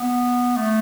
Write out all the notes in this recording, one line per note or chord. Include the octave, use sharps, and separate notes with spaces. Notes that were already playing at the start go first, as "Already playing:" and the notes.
Already playing: B3
A3